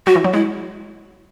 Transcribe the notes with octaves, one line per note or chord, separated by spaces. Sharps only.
F#3 F#4
E3
F#3
G#3 E4